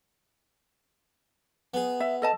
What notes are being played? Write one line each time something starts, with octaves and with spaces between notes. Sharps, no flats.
B3 G#4
E5
A4 D#5 A5